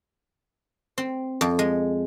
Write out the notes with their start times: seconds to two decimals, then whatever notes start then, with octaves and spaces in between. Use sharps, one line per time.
0.98 C4
1.41 F2
1.59 G#3